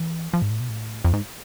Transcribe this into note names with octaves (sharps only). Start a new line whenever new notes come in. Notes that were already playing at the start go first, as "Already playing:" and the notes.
Already playing: E3
F3
G#2
A2
B2
A2
F2
G#2